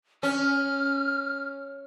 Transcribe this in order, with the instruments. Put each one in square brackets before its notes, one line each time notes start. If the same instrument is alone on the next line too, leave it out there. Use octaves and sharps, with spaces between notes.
[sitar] C#4 [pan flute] F6